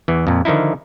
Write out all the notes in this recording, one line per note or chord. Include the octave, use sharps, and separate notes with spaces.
E2 E3
F2 A#2
D3 D#3 F3 D#4 E4